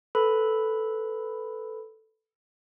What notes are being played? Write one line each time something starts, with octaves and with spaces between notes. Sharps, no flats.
A4 B4 B5